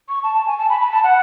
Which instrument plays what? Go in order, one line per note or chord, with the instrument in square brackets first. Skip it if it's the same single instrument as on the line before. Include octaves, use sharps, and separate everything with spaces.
[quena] C#6
A5
A5
G#5
A5
B5
B5
A5
F#5